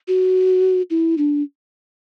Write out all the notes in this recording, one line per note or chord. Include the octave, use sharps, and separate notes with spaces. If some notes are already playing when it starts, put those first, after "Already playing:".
F#4
E4
D4